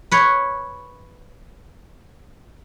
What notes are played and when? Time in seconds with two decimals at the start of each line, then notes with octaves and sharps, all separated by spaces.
0.11 B4 C#5